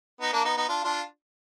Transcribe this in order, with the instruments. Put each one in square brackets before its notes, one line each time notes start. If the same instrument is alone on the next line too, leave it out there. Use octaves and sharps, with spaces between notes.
[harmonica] B3 D#4
A#3 D4
B3 D#4
B3 D#4
D4 F4
D4 F4